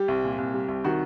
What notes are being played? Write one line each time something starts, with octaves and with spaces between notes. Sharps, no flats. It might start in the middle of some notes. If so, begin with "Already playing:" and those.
Already playing: G3 G4
C2
A#2
C2
G3
C2
D#3 F#4